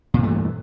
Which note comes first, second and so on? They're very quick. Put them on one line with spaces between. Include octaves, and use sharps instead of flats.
A#2 G2 A3 E3